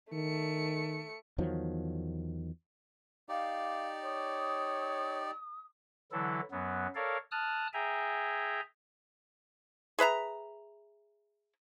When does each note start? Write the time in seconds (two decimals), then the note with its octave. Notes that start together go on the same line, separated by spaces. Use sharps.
0.13 D#3 A3 C#7
1.38 E2 D#3 F3 F#3
3.29 D#4 G4 D5 F5
4.05 C#5 D#6
6.12 D3 E3 F#3 E4 A4
6.51 F#2 F#3 B3
6.95 A4 A#4 C#5 D5 F5
7.32 A5 D#6 F6 F#6
7.73 G#4 E5 G5 G#5 A#5
9.99 G#4 B4 E5 A#5